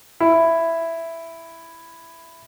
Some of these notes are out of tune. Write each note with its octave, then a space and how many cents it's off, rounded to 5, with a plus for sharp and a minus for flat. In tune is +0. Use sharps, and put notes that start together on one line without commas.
E4 +5